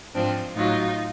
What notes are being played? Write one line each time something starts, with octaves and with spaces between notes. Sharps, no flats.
G#2 F3 C4 D4
A2 F#3 D#4 F4